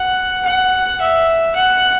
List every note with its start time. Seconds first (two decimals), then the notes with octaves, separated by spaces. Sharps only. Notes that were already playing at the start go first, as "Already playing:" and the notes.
Already playing: F#5
0.45 F#5
1.01 E5
1.56 F#5